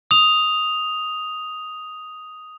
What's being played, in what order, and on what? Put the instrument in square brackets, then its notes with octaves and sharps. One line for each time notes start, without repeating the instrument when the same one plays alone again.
[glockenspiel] D#6 F7